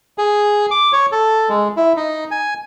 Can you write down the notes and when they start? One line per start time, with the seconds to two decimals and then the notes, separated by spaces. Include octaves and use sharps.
0.18 G#4
0.71 D6
0.93 C#5
1.12 A4
1.49 G#3
1.77 E4
1.96 D#4
2.31 G#5